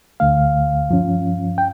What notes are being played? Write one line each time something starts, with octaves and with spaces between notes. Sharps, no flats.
D2 D3 A3 F5
G2 F3 C#4
G5